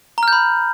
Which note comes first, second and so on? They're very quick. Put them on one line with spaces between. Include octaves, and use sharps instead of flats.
A#5 F6 G6 B5